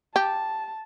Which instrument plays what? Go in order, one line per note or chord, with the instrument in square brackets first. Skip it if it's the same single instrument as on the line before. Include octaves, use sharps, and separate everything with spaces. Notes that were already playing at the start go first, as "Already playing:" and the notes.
[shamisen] G4 [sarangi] A5